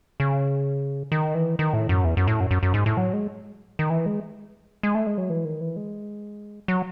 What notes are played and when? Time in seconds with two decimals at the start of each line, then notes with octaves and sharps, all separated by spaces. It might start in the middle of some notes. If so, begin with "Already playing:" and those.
0.20 C#3
1.12 D#3
1.35 E3
1.59 D#3
1.73 A2
1.89 F#2
2.04 E2
2.17 F#2
2.28 A2
2.40 F#2
2.51 F#2
2.63 F#2
2.74 G#2
2.86 A2
2.97 F#3
3.13 G#3
3.79 D#3
3.90 E3
4.06 G#3
4.83 G#3
4.95 A3
5.07 G#3
5.18 F#3
5.30 E3
5.45 D#3
5.61 E3
5.76 G#3
6.68 F#3